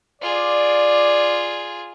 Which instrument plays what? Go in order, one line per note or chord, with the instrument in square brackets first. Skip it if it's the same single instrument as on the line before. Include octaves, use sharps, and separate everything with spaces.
[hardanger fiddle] F4 G#4 [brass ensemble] D5